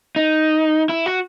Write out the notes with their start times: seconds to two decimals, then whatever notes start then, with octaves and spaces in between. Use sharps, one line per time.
0.16 D#4
0.89 E4
1.06 F#4